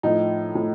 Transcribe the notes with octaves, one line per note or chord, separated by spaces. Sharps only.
A2 F3 D#4
A2 F3